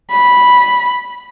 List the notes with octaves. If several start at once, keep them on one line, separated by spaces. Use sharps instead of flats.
B5